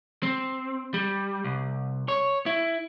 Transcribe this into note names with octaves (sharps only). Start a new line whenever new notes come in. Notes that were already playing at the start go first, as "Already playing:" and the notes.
C4
G3
C2
C#5
E4